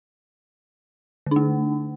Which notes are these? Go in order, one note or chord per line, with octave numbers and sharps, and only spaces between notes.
D3 A3 D4